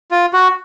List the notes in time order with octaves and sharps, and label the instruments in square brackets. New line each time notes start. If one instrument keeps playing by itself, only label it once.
[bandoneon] F4
F#4